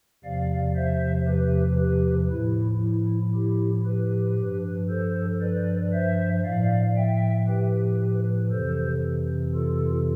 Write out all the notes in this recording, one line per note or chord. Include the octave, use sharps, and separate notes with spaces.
E2 C3 F3 D5 F5
C5 E5
G4 B4
G4 B4
A2 F3 E4
E4
E4 G4
G4 B4
G2 F3
A4 C5
B4 D5
C5 E5
A2 F3 D5 F5
E5 G5
G4 B4
F2 C3 E3 A4 C5
F4 A4